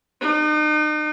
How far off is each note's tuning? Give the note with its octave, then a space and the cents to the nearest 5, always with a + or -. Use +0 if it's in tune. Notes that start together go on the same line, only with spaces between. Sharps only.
D#4 -40